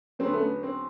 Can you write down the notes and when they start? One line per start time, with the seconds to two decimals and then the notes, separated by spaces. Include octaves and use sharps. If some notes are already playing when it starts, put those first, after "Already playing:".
0.19 E2 D3 F#3 C4
0.27 B3
0.34 A3
0.41 B3
0.63 C4